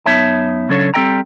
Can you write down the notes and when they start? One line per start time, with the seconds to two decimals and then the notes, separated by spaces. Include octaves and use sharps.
0.06 F#2 B3 D#4 C#5 E5 A5
0.69 C#3 F#3 C#4 D4 A4 C#5
0.94 G3 C4 A4 D#5 G5 A#5